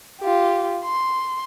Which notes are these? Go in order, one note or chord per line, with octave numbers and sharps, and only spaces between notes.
F4 G4
C6